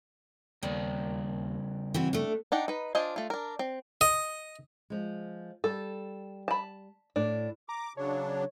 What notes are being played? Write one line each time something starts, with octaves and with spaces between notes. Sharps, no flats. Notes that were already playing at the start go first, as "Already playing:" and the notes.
D#2 C#3 G3 D5
E3 C4 F#4
A3 D4
D4 D#4 F#5 G5
D#4 B4
D4 F4 C5 D#5 G#5
A3 F4
D4 A#4
C4
D#5
F3 G#3
G3 A4
A5 B5
A2 D4
A#5 D6
C#3 F#3 D4 C#5